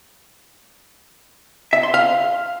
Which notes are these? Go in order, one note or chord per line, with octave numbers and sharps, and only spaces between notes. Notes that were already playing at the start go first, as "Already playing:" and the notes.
E5
C6
F5